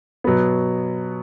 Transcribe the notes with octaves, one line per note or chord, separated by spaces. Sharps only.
B2 F#3 B3